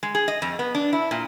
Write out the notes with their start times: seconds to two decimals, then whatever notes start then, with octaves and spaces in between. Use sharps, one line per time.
0.03 G#3
0.15 G#4
0.28 D#5
0.42 F2
0.59 B3
0.75 D4
0.93 E4
1.11 A#2